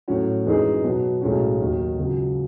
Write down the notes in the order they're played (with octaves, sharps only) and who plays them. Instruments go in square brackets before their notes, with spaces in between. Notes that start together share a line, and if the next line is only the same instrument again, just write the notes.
[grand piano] A2 F#3 C#4 F#4
F#2 E3 G#3 D#4 G#4
B2 F#3 B3
B1 A2 G#3 C#4 F#4
D#2 D#3 F#3
C#2 C#3 F#3